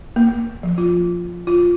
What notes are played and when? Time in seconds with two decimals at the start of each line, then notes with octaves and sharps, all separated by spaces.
0.16 A#3
0.63 F3
0.78 F4
1.47 F4